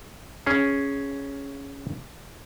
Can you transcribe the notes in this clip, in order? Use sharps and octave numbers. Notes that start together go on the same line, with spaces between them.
C#4 G#4